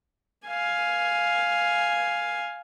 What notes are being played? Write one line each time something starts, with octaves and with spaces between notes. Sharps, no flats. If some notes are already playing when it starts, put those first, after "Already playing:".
F5 G#5